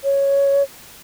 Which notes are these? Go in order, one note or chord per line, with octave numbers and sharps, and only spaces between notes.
C#5